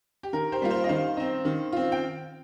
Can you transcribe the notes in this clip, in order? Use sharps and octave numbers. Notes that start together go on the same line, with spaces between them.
G4
D#3 A#4
G4 C5
G3 A#3 F4
C5 F5
D#5
D#3 C5 F5
C4 D#4
D#3
C4 F4
G5